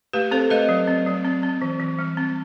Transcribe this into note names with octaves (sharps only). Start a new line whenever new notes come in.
A3 G4 B4
C4 A4 C5
A3 B4 D#5
F#3
C4
F#3
C4
C4
E3
E3
G3
C4